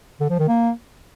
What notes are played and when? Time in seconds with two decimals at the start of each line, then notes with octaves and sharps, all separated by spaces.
0.20 D3
0.30 F3
0.39 D#3
0.48 A#3